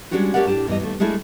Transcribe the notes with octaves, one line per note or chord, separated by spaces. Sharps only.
G3 G#3 C#4 D4 F#4 G4
A3 C#4 G4 A#4 D5 F#5
A2 D4 G4 A5
E2 G2 G3 D#5
D#2 A3
G#3 A3 D4 E4 G#4